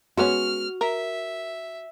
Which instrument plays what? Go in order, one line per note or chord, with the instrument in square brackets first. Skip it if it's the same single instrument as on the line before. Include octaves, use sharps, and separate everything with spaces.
[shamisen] G#3 B3 C#4 [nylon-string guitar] F#4 [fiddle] F6
[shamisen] A#4 [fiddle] E5